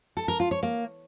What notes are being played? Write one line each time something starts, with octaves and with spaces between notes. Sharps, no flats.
A4
A#4
F4
C#5
A#3